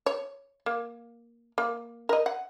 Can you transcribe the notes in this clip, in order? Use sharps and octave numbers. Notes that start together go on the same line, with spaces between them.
C#5
A#3
A#3
A#4 D#5
F#5